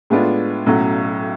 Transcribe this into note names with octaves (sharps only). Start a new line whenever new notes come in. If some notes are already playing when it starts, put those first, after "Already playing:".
A2 G#3 B3 D4 F4
B1 A2 F#3 C#4 F#4